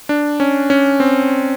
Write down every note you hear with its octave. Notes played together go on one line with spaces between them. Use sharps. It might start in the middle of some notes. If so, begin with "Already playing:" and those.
D4
C#4
C#4
C4